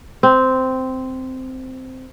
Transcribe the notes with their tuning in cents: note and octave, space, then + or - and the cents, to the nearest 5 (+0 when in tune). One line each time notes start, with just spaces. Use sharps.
C4 -10